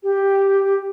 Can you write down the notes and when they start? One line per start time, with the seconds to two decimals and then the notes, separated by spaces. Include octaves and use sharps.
0.03 G4